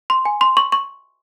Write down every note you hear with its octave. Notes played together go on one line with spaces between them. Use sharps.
C6
G#5
C6
C#6
C#6